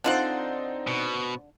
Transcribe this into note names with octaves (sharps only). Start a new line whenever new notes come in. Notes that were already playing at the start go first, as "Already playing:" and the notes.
D3 C4 D#4 F4 C5 D5 F#5
B2